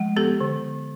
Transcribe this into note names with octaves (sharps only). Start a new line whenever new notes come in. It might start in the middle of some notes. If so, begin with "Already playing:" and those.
Already playing: F3 G#3
B3 G4 A4
D3